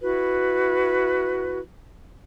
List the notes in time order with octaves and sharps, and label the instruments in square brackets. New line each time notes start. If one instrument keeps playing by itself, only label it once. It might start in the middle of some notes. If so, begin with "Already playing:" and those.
[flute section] E4 F#4 B4